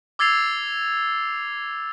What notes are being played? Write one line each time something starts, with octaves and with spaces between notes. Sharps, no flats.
D6 E6 G#6 A6 C7 F7